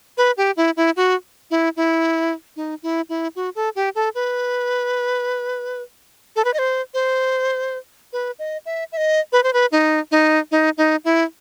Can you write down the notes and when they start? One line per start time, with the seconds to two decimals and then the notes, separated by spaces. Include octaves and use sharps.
0.17 B4
0.37 G4
0.57 E4
0.77 E4
0.96 F#4
1.51 E4
1.77 E4
2.56 D#4
2.83 E4
3.09 E4
3.36 F#4
3.55 A4
3.75 G4
3.95 A4
4.15 B4
6.36 A4
6.45 B4
6.54 D#5
6.59 C5
6.94 C5
8.13 B4
8.39 D#5
8.66 E5
8.92 E5
8.97 D#5
9.32 B4
9.43 C5
9.53 B4
9.72 D#4
10.11 D#4
10.51 D#4
10.77 D#4
11.05 E4